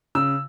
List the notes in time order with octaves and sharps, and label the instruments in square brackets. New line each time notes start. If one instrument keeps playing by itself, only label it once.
[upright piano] C#3 E6